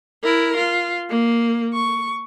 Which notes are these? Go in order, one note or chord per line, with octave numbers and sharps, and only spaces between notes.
E4 A#4
F4
A#3
C#6